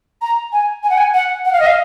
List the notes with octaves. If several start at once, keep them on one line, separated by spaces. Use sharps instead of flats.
A#5
G#5
G#5
F#5
G#5
F#5
F#5
F5
D#5
F5